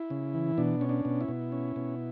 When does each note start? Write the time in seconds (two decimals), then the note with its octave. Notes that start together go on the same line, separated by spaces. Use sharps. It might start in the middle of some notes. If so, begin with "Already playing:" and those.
Already playing: E4
0.10 C#3
0.34 E3
0.58 B2 D4
0.81 C#4
0.89 D4
1.05 B2
1.21 E4
1.28 B2
1.52 C#4
1.76 B2